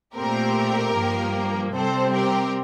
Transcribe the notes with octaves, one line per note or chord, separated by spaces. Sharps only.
A#2 A3 C4 G4 A#4
G2 F3 A#3
C3 G3 C4 A4 C5
G4 A#4